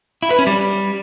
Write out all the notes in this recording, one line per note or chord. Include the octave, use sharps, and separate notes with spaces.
E4
B4
C#4
G3